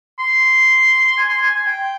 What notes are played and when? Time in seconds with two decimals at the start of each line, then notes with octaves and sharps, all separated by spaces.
0.19 C6
1.17 G#5
1.29 C6
1.41 G#5
1.55 G#5
1.66 G5